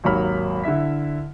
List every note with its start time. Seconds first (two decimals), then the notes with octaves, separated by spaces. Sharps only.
0.04 G#1 D#2 F#3 A#3 B5 F6
0.64 D3 E4 E5 B6